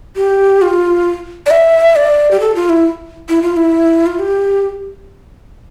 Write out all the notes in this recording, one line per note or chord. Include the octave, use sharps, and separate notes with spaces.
G4
F4
D5
E5
D5
G4
A4
F4
E4
E4
F4
E4
F4
G4